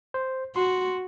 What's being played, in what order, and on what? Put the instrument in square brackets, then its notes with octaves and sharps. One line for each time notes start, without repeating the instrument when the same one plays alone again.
[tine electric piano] C5
[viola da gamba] F#4 [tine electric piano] C6